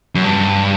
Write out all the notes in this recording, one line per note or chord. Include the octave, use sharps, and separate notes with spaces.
F#2
G2